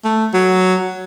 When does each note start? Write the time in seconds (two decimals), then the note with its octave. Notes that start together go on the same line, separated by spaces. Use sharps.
0.04 A3
0.34 F#3